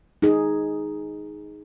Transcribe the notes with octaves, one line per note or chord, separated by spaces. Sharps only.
D#4 G#4